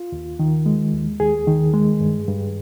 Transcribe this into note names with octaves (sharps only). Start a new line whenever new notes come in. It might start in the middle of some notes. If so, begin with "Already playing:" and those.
Already playing: F4
D#2
D#3
G#3
D#2
D#2 G#4
D#3
G#3
G2
G2